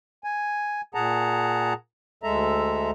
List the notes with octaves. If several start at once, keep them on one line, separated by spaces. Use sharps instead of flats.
G#5
A#2 G#4 F#5 A5 A#5
D2 G#3 A4 E5 A#5